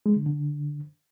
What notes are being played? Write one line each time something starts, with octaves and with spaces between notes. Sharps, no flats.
G#3
D3
D3